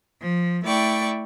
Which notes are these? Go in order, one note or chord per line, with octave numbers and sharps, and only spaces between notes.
F3
A3 E4 D5 G5 C#6